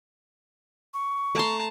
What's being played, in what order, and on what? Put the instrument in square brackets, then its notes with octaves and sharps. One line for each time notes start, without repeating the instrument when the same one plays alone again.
[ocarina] C#6
[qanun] A3 C6 [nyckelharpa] A5 A#5